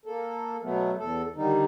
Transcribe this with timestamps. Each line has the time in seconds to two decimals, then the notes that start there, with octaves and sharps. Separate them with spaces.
0.05 A#3 A4
0.63 B2 F#3 A3 B3
0.99 E2 A4
1.36 D3 D#3 G3 D#4